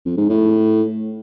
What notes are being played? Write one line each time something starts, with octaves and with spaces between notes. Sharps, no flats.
F2
G#2
A2